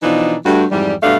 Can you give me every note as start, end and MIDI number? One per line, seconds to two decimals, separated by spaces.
0.03 0.35 47
0.03 0.35 52
0.03 0.35 53
0.03 0.35 62
0.03 0.35 63
0.46 0.64 43
0.46 0.64 57
0.46 0.64 66
0.71 0.94 41
0.71 0.94 44
0.71 0.94 52
0.71 0.94 55
1.03 1.17 43
1.03 1.17 47
1.03 1.17 57
1.03 1.17 62
1.03 1.17 74
1.03 1.17 77